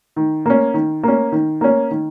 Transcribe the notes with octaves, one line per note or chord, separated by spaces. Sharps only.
D#3
A#3 C#4
D#3
A#3 C#4
D#3
A#3 C#4
D#3